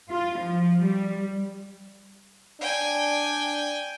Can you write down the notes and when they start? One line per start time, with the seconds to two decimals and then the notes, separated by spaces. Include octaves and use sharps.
0.10 F4
0.39 F3
0.84 G3
2.61 D4 G5 G#5